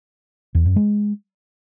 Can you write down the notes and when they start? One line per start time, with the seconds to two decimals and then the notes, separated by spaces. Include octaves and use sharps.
0.55 E2
0.65 F#2
0.76 G#3